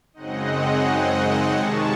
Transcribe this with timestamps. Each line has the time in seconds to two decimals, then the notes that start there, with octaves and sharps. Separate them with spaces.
0.14 F#2 C#3 G#3 C4 D#4 D#5 F#5
1.51 C3 D#3 G#3 C#4 A5 C#6